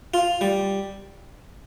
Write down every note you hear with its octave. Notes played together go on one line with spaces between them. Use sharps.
F4
G3